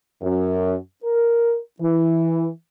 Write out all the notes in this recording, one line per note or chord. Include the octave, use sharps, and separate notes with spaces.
F#2
A#4
E3